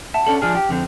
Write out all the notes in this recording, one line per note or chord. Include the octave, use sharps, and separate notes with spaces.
E5 F#5 A5
C#4 D4 A4 F#7
F3 D4 G#4 F6
G4
F2 D3 C4